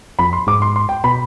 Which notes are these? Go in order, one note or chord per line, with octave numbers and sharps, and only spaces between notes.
F2 B5
C6
G#2 D6
C6
C6
G5
B2 B5